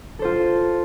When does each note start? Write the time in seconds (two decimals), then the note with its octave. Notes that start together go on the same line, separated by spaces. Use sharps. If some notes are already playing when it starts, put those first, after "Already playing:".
0.19 A4
0.22 C5
0.25 F4